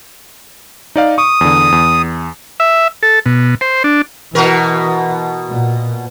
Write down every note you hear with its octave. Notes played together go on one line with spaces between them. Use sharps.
D#4 D5 F5
C#6 D#6
E2 D3
E2
E5
A4
B2
C5
D4
B2 E3 F#4 A#4
A#2